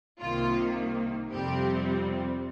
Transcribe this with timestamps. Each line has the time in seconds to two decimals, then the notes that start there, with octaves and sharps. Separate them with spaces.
0.21 C2 C3 D#3 A#3 F4
1.32 F2 C3 G3 C4 G4